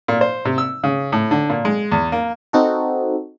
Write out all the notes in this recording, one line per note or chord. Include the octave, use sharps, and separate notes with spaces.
A#2
C5
C3
E6
C#3
A2
D3
A#2
G#3
E2
A#3
C4 D#4 F#4 A4